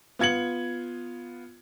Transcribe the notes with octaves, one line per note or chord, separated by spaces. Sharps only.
B3 F4 G#6 C#7 F#7